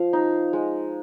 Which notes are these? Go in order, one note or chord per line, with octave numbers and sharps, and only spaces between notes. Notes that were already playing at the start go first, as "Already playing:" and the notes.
Already playing: F3 F5
D#4
G#3